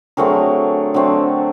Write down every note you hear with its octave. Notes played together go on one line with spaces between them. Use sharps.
D3 F#3 A3 C4 G#4 A#4
D3 F#3 A3 C4